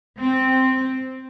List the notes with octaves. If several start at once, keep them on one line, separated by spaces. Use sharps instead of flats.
C4